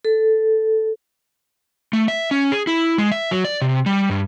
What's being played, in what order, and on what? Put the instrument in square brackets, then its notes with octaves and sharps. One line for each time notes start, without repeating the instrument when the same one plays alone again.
[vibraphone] A4
[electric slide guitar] A3
E5
C#4
G#4
E4
G#3
E5
F#3
D5
C3
G3
G2